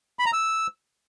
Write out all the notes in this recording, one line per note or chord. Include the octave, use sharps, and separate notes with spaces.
B5
A#5
E6